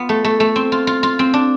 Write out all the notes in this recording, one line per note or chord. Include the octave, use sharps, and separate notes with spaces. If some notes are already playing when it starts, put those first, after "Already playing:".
Already playing: B3 F4
A3
A3
A3
C4
F4
F4
F4
C4
D4